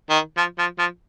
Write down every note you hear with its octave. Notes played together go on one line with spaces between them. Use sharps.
D#3
F3
F3
F3